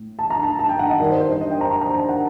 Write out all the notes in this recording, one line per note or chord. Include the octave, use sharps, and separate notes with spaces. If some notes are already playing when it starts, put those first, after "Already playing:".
Already playing: A2
A5
A#5
A5
A5
G5
F#5
D#5
G2 D#3 D5
C5
C5
D#5
D#5
G5
A#5
A#5
A#5
A5
F#5